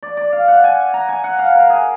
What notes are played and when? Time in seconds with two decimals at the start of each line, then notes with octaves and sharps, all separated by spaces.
0.03 D5
0.17 D5
0.33 F5
0.48 F#5
0.64 G#5
0.94 A#5
1.09 G#5
1.24 F#5
1.39 F5
1.55 A#4
1.70 G#4